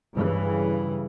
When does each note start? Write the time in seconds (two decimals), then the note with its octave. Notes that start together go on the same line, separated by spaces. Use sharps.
0.15 G2 C#3 E3